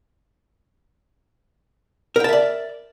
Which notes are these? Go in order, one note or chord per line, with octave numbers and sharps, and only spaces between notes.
A#4 D5 E5 G5 A5